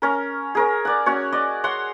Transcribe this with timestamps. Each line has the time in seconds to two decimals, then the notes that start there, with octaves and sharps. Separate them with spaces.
0.02 C#4 A#4
0.55 G#4 A#4 C#5
0.85 D5 F#5
1.06 C#4 F#4 C#5
1.32 D5 D#5
1.64 C#5 F#5 C6